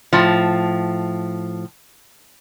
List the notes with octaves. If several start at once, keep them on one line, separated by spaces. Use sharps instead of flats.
A2 F3